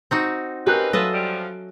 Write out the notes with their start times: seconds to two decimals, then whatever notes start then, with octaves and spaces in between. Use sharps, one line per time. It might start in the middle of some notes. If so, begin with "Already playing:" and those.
0.11 C4 D#4 F#4
0.67 C4 C#4 D#4 G4 A#4 B4 F#6
0.93 F#3 F4 A4 B4 D#5 E5 A5
1.13 F3 G3